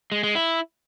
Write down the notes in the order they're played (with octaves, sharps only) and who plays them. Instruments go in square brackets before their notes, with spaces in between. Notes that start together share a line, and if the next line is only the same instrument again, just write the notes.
[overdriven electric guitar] G#3
G#3
E4